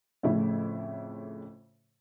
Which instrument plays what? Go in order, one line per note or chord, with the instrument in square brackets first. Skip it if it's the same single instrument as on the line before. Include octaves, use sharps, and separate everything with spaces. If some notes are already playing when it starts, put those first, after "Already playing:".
[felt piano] F2 A2 C#3 F3 A3 E4